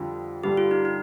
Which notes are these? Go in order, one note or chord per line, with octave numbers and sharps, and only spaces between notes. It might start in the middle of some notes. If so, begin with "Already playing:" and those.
Already playing: F2 D3 G3 F4
G2 D3 G3 G4
F4
D#4
D#4